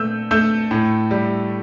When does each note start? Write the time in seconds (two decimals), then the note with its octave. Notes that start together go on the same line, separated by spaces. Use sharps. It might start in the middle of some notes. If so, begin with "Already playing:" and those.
Already playing: A#2 A3 E6 G6
0.31 A3 E6 G6
0.71 A2
1.11 G3